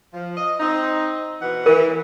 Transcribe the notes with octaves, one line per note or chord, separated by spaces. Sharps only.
F3
D#5
C4 D#4
B2 E3 F#5
E3 A#4